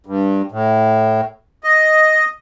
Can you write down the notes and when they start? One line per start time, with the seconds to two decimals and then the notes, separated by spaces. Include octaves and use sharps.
0.06 G2
0.52 A2
1.64 D#5